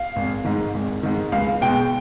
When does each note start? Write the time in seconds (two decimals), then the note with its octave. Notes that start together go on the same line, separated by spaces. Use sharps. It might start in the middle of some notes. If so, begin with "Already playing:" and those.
Already playing: F5
0.16 G#1
0.45 G#2 D#3
0.74 G#1
1.03 G#2 D#3
1.32 C#2 F5
1.61 B2 G#3 G5